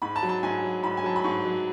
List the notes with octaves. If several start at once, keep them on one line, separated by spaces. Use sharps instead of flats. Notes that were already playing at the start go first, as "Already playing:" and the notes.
G#2 B5
A5
F#3
A5
G#2 G#5
F#3
G#2 B5
G#5
F#3 A5
B5
G#2 C#6
F#3